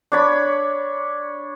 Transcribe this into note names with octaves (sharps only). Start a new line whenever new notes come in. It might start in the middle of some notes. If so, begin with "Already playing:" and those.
D4 C#5 B5